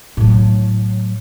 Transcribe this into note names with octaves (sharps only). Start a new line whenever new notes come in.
A2 F#3